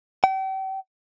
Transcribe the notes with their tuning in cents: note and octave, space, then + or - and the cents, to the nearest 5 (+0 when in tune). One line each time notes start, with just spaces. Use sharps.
G5 -40